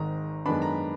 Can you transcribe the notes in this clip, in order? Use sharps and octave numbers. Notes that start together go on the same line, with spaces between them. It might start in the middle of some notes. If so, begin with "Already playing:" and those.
Already playing: G#1 G#2 D#3 A#5
F#2 D#3 G#3 B3 D4 B5
A#5